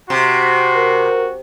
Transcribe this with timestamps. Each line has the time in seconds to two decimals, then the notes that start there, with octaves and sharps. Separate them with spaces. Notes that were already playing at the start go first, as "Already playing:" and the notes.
0.10 C3 F#4 C6
0.75 A#4